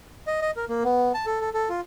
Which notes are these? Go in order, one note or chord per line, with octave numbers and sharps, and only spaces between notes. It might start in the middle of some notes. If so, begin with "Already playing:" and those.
D#5
D#5
A#4
A#3
B3
A5
A4
A4
A4
F4